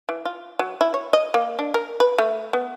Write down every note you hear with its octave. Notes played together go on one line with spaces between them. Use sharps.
E3
F4
F#3
E4
C#5
D#5
A#3
D4
A#4
B4
A3
B3